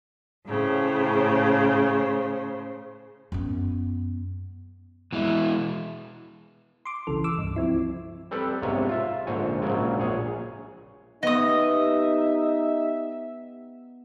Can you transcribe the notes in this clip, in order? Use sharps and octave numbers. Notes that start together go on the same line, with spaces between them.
A2 C#3 C5
F#2 B3
B2 E3 G#3 E4
C6 D6
B1 C#3 E3 A4
D6 E6
C#2 G2
F3 C4 E4
G3 C4 G4 A4 B4
B1 G#2 C3 D4 C#5 A#5
F4 E5
A#1 G#2 D3 C5 C#5 G#5
A#1 G#2 C#3 F#3 G#5
A#1 G#4 C#5
B3 D#4 G4 D#5 E5 D#6